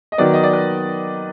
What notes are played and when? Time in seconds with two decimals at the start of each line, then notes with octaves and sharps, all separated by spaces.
0.12 D#5
0.18 D#3 F#3 B3 D5
0.33 D#5
0.43 D5
0.53 B4